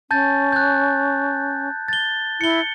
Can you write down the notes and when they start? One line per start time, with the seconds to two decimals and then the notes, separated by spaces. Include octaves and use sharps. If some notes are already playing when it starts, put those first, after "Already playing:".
0.11 C#4 A5 G6 A6
0.52 F#6 G6
1.88 A6 G7
2.41 E4 C#7 G7